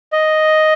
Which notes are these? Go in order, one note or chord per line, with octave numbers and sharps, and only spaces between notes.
D#5